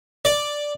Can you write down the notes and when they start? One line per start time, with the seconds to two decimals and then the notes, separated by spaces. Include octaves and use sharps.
0.25 D5